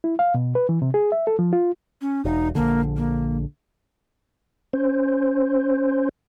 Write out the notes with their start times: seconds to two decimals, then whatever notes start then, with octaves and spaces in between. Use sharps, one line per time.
0.04 E4
0.19 F5
0.35 B2
0.55 B4
0.69 E3
0.82 C3
0.94 G#4
1.12 E5
1.27 A4
1.39 F3
1.53 F4
2.01 C#4
2.25 E1 D#4
2.55 A#1 D3 A#3
2.97 A#3
4.73 C#4 C5